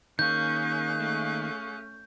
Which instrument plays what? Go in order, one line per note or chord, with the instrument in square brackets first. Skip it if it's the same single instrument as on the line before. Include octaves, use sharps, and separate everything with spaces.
[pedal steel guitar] D#3 A#3 [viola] C#4 [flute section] G#4 F5 F#6 [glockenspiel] G6
[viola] A3 C#4